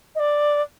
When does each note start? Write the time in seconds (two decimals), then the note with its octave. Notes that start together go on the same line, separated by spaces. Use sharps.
0.15 D#5
0.19 D5